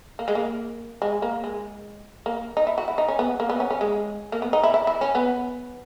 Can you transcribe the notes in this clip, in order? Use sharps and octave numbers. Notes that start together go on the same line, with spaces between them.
A#3
G#3
A#3
G#3
A#3
G#3
A#3
D#4
E4
F#4
E4
D#4
C#4
B3
A#3
B3
C#4
C#4
G#3
A#3
B3
D#4
E4
E4
E4
C#4
B3